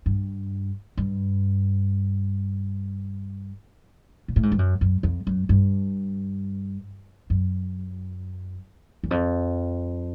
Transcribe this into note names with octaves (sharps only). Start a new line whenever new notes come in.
G2
G2
A#2
A2
G#2
G2
F#2
F#2
F2
F#2
G2
F#2
E2
F2